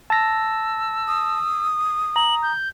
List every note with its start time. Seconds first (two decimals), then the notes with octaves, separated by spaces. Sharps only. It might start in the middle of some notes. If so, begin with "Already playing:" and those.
0.10 A5 E6 A#6
1.07 D#6
2.16 A#5 F#7
2.43 G6